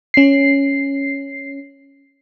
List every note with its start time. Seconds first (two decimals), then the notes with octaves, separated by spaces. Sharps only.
0.14 C#4 C7